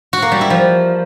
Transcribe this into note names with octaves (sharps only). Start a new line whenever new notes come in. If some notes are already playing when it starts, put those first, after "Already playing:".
F#4
A#3
G3
E4
F3